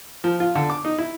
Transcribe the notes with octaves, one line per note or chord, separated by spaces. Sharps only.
F3
F4
D3
D6
D#4
E4